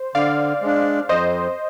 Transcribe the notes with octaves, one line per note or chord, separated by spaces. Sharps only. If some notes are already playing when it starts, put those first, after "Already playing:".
Already playing: C5
D3 D5 F5
G#3 D4
F2 C5 D#5